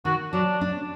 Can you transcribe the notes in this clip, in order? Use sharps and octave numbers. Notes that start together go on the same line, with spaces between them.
D#3 F#4
F#3 D4
D4